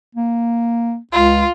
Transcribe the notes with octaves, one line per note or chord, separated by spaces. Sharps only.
A#3
C#2 F4